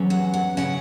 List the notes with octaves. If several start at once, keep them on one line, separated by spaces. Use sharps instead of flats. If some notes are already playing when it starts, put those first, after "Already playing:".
Already playing: E2 F#3 C#4
F#5
F#5
C#3 F#3 C#4 F#5